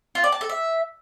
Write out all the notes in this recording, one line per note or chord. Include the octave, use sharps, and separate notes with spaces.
F4
D5
A5
A4
E5